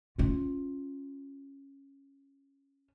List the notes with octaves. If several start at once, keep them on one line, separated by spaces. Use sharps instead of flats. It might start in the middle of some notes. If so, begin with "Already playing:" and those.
C#4 F4